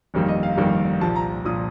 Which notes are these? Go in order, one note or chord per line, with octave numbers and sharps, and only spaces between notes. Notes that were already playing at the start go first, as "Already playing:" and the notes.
G1 F2 D#3 G3 A#3
D#5
F5
G1 F2 D#3 G3 A#3
C2 A#2 F3 A5
A#5
A#2 F3 D#6